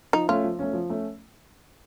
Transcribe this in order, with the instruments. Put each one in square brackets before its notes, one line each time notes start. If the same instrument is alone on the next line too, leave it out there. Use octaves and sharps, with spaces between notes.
[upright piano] F3 [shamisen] D#4
[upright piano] A3 C#4 [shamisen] F4
[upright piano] F3
A3 C#4
F3
A3 C#4